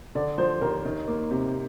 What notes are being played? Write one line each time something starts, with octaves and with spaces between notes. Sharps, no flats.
D3 D5
F3 C5
D#2 A#4
D#3
A#3
C3